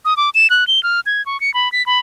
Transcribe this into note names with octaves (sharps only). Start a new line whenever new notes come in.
D#6
D6
E7
F#6
G7
F6
G#6
C#6
C#7
B5
B6
B5